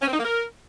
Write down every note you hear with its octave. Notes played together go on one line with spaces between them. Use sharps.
C#4
C4
D#4
A#3
A#4